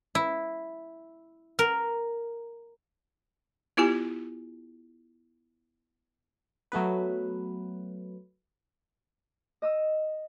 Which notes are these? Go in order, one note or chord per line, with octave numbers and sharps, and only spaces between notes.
E4
A#4
B3 E4 F4 G4 G#5
F#3 A3 B3 B4
D#5 D#6 E6